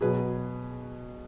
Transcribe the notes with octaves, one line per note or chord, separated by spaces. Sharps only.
B2 F#3 G#4 B4